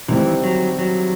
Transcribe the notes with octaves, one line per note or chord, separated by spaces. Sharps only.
C3 D#3 E3 G3 C4
F#3
F#3